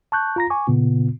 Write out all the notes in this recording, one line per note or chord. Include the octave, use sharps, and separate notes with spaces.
A5 C#6 F#6 G6
F4 A#5 A#6
G#5 C#6 D6
A#2 C#3 B3 F4